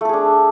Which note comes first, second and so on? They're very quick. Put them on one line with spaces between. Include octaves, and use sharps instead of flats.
A3 A4 G#4 D4